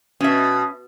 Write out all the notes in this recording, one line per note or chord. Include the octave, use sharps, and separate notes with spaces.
B2 C#4 E5